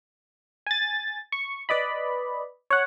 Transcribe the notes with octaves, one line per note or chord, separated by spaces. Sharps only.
G#5 A6
C#6
B4 D5 D#5 B5
C#5 F#5